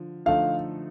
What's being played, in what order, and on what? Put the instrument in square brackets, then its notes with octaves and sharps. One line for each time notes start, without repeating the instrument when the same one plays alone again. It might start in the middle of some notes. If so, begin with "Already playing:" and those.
Already playing: [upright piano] D3 F3
[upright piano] D3 F3 A3 D#4 A4 [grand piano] F5